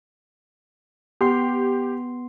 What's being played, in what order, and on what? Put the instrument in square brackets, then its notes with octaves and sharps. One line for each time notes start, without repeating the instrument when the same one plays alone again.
[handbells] B3 C6 C7 [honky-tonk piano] G4